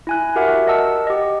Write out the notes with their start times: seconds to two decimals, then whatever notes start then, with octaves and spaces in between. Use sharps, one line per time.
0.07 E4 G#5 F#6
0.36 F#4 G4 A#4 E5 F#5
0.67 A#4 D#5 F#5 A5 E6
1.07 G4 D#5